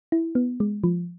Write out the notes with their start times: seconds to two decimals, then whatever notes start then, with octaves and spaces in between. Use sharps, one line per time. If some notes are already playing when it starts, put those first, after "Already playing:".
0.12 E4
0.35 B3
0.60 G#3
0.84 F3